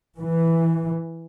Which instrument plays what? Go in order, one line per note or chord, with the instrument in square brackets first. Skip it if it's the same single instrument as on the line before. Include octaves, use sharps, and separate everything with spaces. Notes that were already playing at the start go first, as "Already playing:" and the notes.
[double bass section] E3